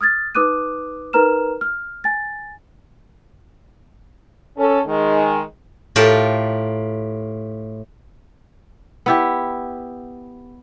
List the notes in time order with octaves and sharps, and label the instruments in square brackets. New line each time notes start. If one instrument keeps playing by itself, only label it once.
[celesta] D#6 F6 G#6 A6
D#4 B4 D6 D#6 F#6 D#7
D#4 A#4 B4 A#5 F6 E7
F6
G#5 A6
[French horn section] C#4 A4
D#3 G#3
[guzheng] A2 F4 G4 A#4 A5
[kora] B3 E4 G4